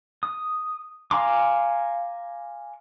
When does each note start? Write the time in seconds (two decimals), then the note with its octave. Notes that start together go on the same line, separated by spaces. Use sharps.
0.23 D#6
1.11 F5 G#5 A#5 C6 D6